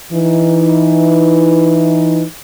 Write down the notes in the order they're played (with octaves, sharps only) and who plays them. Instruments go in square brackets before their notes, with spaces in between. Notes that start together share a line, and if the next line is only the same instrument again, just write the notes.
[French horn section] E3 D#4